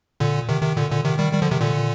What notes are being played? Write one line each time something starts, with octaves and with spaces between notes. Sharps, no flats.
A#2 D3
C3 D#3
C3 D#3
A#2 D3
A#2 D3
C3 D#3
D#3 G3
D#3 G3
D3 F3
C3 D#3
A#2 D3